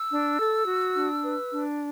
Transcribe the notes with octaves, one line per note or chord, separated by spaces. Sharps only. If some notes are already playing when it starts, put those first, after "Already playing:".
Already playing: E6
D4
A4
F#4
D4
B4
D4